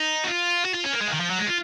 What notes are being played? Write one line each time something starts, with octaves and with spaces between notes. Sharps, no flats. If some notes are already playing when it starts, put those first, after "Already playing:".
Already playing: D#4
F#4
F4
F#4
F4
C#4
A#3
G#3
C#3
D#3
F3
F#3
G#3
F4